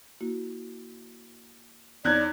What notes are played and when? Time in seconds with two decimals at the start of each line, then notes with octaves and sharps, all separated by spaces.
0.21 A#3 E4 F#4
2.05 E2 D#4 C#5 D5 F#6 G#6